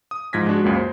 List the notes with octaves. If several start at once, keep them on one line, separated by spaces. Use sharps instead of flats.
D#6
G#2 F3 G#6 A#6 B6
G#3 D4 F#4
C#2 F#2 C#3 A#3
C5